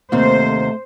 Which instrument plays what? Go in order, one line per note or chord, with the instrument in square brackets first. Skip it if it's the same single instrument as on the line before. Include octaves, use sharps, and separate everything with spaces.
[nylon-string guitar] D#2 C3 [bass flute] A3 [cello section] C5